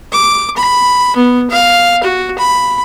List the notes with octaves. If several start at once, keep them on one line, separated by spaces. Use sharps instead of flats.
D6
B5
B3
F5
F#4
B5